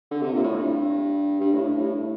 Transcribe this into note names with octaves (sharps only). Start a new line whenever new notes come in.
D3
C3
A#2
A2
G2
G2
A2
G2
A2